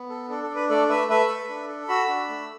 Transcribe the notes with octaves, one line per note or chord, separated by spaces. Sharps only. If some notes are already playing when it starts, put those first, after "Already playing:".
Already playing: B3
A4
D4 A4
A4
D4
B4
A3 A4 D5
A3 B4 E5
A3 B4 E5
A4
D4
A4
F#4 B5 E6
D4
A3